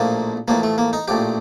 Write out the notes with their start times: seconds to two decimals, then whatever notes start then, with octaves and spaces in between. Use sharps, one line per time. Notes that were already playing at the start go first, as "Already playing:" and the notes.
Already playing: A#1 A2 F3 A#3
0.48 A1 A2 F3 A#3
0.63 A3
0.78 A#3
0.93 D#4
1.08 A#1 A2 F3 G4